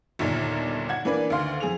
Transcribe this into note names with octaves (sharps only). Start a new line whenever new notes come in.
G1 D#2 A#2 D#4
F#5 G#6
E3 A#3 D4 B4 D5
D2 D#3 F5 C6
F2 G#4 F7